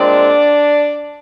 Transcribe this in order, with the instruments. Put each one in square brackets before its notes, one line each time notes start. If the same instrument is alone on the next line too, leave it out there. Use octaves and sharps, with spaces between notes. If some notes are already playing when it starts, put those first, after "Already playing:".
Already playing: [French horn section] A#2 G#3 C4 D4 D5